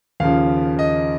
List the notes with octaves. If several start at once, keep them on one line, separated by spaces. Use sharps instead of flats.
D#2 C#3 F3 F5
D#5